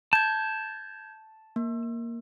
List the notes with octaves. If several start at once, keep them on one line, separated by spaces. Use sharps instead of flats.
A5 G6 G#6
A#3